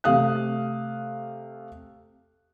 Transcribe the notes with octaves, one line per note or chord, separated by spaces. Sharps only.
C3 A3 F5 D#6 F#6